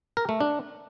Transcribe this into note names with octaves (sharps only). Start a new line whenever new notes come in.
A#4
A3
D4